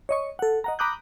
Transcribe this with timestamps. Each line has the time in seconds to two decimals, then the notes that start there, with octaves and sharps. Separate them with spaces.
0.09 C#5 D#5 C#6
0.39 A4 F#5
0.64 D#5 F#5 A#5
0.79 A#5 B5 D6 D#6 F#6 G6